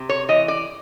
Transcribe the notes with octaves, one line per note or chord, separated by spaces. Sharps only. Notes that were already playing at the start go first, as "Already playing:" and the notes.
Already playing: C3
C#5
E3 D#5
D5